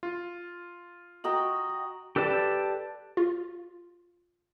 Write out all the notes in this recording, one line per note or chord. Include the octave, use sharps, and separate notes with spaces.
F4
F#4 D#5 G5 A#5 D#6 F#7
G4 A4 B4 D5 A5
F4